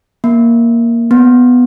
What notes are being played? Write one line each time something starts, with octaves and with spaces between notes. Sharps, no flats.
A#3
B3